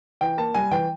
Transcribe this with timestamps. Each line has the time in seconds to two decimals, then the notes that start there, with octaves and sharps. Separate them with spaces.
0.21 E3 G5
0.37 A#3 A5
0.54 G3 G#5
0.71 E3 G5